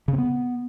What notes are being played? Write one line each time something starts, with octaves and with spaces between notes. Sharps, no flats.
C#3
C4
B3